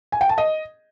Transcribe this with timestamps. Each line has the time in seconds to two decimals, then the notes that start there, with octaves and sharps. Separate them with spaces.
0.12 G#5
0.21 G5
0.29 A5
0.38 D#5